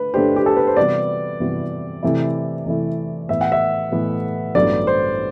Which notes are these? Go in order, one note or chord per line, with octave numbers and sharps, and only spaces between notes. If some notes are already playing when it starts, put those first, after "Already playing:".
Already playing: D3 A3 B4
D3 A3 D4 G4 C5
G4
A4
B4
C5
C3 E3 G3 B3 F#4 D5
C3 E3 G3 B3 F#4
C3 E3 A3 E4
C3 E3 A3 E4
A2 E3 B3 E5
F#5
E5
A2 E3 B3
A1 G2 D3 F#3 B3 D5
C5